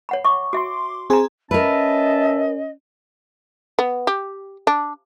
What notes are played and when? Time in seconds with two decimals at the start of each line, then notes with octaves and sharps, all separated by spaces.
0.09 C#5 F#5 B5
0.25 E5 C#6 D6
0.53 F#4 E5 C6 D6
1.10 C4 G#4 G#5 A#5 C6
1.51 C#4 A#4 B4 D#5 E5 A5
3.79 B3
4.07 G4
4.67 D4